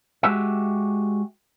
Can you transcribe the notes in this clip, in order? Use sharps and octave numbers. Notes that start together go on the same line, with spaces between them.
G#3 F#4 G4 E5